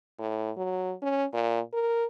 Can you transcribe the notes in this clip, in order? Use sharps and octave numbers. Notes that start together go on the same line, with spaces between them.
A2
F#3
C#4
A#2
A#4